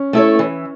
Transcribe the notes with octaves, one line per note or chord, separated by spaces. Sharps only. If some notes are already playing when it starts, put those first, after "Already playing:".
Already playing: C#4
A3 E4 A4 C#5
E3